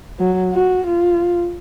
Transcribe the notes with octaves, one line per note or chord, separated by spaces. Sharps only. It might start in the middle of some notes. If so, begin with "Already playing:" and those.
F#3
F#4
F4